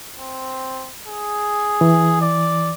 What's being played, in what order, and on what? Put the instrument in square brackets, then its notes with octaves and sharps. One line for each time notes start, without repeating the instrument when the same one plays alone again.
[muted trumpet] C4
G#4
[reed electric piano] E3
[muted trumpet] D5